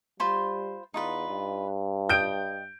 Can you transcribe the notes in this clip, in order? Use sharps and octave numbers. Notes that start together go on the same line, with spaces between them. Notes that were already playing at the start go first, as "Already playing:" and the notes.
G3 F4 C5 B5
E2 D#4 F4 B4
G2
D#5 G5 G6 D7